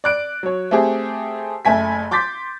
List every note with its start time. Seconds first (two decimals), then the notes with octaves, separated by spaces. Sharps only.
0.04 D5 F#6 D7
0.43 F#3 C#5
0.71 A3 C4 G4 G#4
1.65 F#1 A3 G#5 B6
2.11 C6 D6 G6 A6 B6